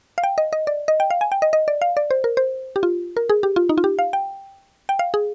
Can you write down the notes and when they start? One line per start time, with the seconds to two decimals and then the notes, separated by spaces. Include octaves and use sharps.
0.18 F5
0.24 G5
0.38 D#5
0.53 D#5
0.67 D5
0.88 D#5
1.00 G5
1.10 F5
1.21 G#5
1.32 G5
1.42 D#5
1.53 D#5
1.68 D5
1.82 F5
1.97 D5
2.11 C5
2.24 A#4
2.37 C5
2.76 G4
2.83 F4
3.17 A#4
3.30 G#4
3.43 G4
3.56 F4
3.69 D#4
3.78 F4
3.84 G4
3.99 F5
4.13 G5
4.89 G5
4.99 F5
5.14 G#4